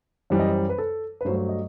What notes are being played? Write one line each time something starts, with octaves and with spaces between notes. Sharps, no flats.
F#2 E3 G3 C5
D#5
C5
B4
A4
B4
G2 F#3 A3 C5
C5
D#5